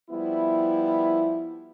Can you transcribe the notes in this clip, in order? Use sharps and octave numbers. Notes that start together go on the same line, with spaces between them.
F3 G3 B3 E4